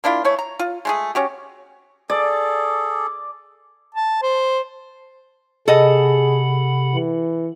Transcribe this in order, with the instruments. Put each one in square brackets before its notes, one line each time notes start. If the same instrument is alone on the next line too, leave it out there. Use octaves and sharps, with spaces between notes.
[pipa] A#3 D4 E4 F4
E3 A3 C#5
A#5
F4
G#3 A3 G#4
C#4 F#4 G4
[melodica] G#4 A4 [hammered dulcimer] D5
[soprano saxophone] A5
C5
[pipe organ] C3 F#5 B5 [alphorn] G#4 [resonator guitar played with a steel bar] A4 D#5
[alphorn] E3